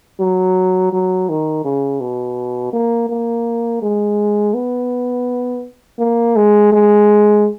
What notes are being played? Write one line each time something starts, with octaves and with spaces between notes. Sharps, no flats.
F#3
F#3
D#3
C#3
B2
A#3
A#3
G#3
B3
A#3
G#3
G#3